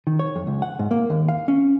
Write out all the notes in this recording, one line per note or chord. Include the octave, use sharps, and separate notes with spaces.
D#3
C#5
F2
C#2
F#5
G#2
A#3
D#2
F5
C#4